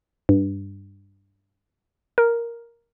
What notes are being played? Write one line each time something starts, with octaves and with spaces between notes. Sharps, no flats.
G2
A#4